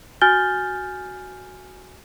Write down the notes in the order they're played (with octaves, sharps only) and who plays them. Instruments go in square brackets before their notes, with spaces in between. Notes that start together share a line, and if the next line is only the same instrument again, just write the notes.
[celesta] F#4 G#5 F6 G6 A6 G7